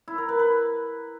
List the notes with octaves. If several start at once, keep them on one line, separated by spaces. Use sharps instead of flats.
E4
A#4
B4
B4